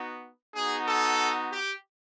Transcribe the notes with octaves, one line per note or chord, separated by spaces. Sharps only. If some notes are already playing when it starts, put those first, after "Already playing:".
Already playing: B3 D#4 F#4
B3 D#4 F#4 G#4
A4
G4